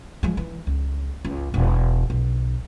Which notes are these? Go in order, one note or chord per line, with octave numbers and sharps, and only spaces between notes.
F3 G#3
E3
C#2
C#2
E1
B1